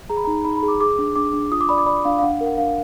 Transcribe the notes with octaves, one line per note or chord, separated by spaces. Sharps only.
G#4 A#5
B5
D#4 A#5
D#4 B5
B5
G#4
D6
G#4 D6
D4
D4 D6
D4
F4 D#6
D6
D5 B5
D6
D5 B5
D4 F5
F5
D4 F#5
A#4
F#5
D4 F5